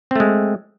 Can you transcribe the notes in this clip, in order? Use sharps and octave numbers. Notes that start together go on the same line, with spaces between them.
G#3 A3 C4